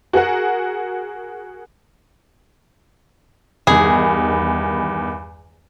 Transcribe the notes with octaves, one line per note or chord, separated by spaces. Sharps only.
F#4 G#4 A#4 F#5
E2 G2 D#3 G#4